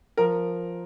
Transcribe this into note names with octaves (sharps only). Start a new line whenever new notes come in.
F3 A#4